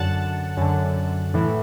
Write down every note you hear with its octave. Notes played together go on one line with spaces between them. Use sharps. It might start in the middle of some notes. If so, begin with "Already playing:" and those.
Already playing: F#2 D3 F#5 A5
F#2 D3
A2 E3